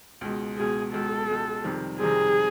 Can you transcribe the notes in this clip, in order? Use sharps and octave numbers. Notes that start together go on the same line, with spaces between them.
C#2 B2 G#3
C#2 B2 G#3 G#4
C#2 B2 G#3 A4
C#2 B2 G#3
F2 C3 D#3 G3 C4
F2 C3 D#3 G3 C4 G#4